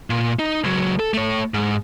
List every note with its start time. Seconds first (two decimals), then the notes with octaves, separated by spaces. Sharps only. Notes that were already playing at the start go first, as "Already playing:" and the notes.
0.10 A#2
0.39 D#4
0.64 C#2 F#3
0.99 A4
1.14 A3 C#5
1.54 G#2